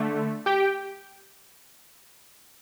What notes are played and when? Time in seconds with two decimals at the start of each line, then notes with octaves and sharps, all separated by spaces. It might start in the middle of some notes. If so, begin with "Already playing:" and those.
Already playing: D3 A3
0.46 G4 G5